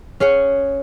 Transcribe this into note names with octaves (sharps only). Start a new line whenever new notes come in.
C#4 G#4 C#5 F#5